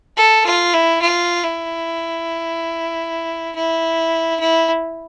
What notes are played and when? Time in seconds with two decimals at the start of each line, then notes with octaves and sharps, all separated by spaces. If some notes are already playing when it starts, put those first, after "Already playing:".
0.17 A4
0.46 F4
0.74 E4
1.02 F4
1.44 E4
3.55 E4
4.40 E4